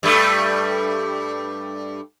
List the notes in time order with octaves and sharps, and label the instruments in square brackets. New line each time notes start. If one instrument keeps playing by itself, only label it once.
[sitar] G2 G3 A3